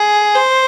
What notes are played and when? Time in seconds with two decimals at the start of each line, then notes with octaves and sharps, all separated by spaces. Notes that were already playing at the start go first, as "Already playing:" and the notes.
Already playing: G#4
0.35 C5